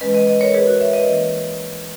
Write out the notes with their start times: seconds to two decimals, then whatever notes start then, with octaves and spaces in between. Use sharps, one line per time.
0.01 E3 G#3 C#4 B4 D#5
0.14 B4 D#5
0.27 B4 D#5
0.41 A#4 C#5
0.54 G#4 B4
0.67 F#4 A#4
0.81 C#5 E5
0.93 B4 D#5
1.07 E3 A#3 C#4